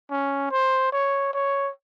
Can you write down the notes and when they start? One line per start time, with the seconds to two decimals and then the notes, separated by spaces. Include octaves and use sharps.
0.11 C#4
0.51 C5
0.92 C#5
1.34 C#5